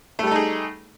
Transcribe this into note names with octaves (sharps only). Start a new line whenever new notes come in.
G3 A3 D#4 G#4 A4